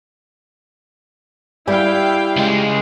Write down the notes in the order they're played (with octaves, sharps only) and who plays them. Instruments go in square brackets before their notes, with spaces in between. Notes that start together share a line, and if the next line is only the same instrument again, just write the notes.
[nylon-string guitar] G3 G4 G#5 [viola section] E4 F5 G5
[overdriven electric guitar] C#2 G#3